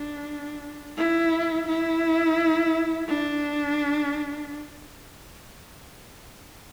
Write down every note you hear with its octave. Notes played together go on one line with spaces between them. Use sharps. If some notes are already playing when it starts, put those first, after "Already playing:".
Already playing: D4
E4
E4
D4